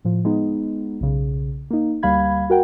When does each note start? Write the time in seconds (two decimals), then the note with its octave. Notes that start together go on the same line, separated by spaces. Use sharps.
0.05 A2 F3
0.25 G#3 B3 D#4
1.01 B1 C#3
1.71 A#3 D#4
2.03 D2 G3 A#3 F5 B5 G#6
2.50 F#4 A#4 F#5 G5